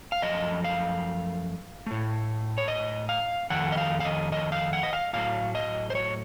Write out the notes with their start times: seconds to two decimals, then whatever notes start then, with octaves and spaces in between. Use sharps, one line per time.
0.12 F5
0.22 F#2 F3 A3 D#5
0.64 F5
1.87 A2 A3
2.58 C#5
2.68 D#5
3.09 F5
3.50 F2 D#3 A3 F#5
3.72 D#5
3.77 F5
4.00 F5
4.05 D#5
4.32 D#5
4.52 F5
4.73 F#5
4.83 D#5
4.93 F5
5.13 A2 F#3 A3 F5
5.55 D#5
5.90 C5
5.95 C#5